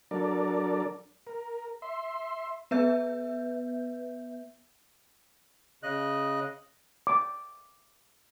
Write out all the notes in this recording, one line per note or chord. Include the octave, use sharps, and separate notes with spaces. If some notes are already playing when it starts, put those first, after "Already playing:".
F#3 D4 A4 A#4 D5
A#4
E5 C6
B3 B4 E5 G6
C#3 D#5 F#6
D6